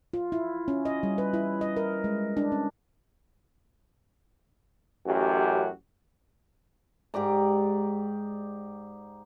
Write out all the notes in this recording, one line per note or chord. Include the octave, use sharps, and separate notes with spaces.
F4
E4
C#4
D#5
G3
B4
E4
D#5
A#4
G#3
D4
C#4
A1 F#2 F#4 G4
G#2 G4 D5 A#5